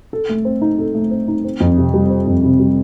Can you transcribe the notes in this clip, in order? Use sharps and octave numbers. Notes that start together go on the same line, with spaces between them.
A4
A3
C4
D#4
A4
A3
C4
D#4
C4
F2
C3
G3
C4
F2
C3
G3